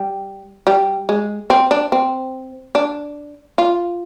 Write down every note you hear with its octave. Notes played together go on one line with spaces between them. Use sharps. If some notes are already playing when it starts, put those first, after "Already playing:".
Already playing: G3
G3
G#3
C4
D4
C4
D4
F4